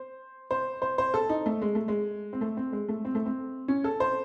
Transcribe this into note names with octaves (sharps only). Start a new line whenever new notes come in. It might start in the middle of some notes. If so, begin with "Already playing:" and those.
Already playing: C5
C5
C5
C5
A4
D#4
A3
G#3
A3
G#3
C4
A3
C4
G#3
A3
C4
A3
C4
C#4
A4
C5